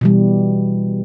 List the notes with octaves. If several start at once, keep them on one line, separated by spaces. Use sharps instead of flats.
B2 E3 G3